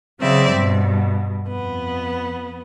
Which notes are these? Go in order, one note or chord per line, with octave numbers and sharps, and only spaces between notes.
C#3 F#3 C4 D5 E5
G2 B2
F2 B3